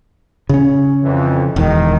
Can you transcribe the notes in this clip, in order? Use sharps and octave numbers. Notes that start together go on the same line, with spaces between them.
C#3 C#4
F2 E3
E1 D#3